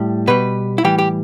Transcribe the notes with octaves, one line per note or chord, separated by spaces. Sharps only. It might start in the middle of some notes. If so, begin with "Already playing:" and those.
Already playing: A2 G3
B2 G3 B4
E4
A2 E3 G3 G4
G4